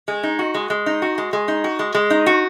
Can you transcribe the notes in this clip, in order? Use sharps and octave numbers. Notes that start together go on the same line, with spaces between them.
G#3
D#4
F#4
G#3
G#3
D#4
F#4
G#3
G#3
D#4
F#4
G#3
G#3
D#4
F#4